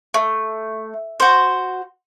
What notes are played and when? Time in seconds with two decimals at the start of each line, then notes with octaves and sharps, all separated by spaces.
0.14 A3
1.20 F#4 C5